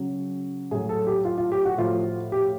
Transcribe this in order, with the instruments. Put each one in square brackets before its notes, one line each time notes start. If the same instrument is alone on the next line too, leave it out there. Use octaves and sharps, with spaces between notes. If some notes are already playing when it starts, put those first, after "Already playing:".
Already playing: [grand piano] C#3 F#3
A2 F#3 G#4
A4
G4
F4
F4
G4
F#4
A2 F3 F4
G4